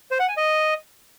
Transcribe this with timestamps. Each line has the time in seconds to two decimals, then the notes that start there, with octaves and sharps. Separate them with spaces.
0.11 C5
0.20 F#5
0.28 G#5
0.37 D#5